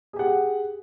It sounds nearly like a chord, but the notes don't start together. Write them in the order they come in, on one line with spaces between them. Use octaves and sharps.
G#4 G4 F#5